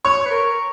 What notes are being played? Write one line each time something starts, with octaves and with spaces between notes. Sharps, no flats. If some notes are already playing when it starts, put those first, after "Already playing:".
C#5 C#6
B4
A#4